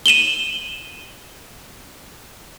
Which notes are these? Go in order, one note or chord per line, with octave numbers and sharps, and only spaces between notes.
D#7 E7 F#7 G7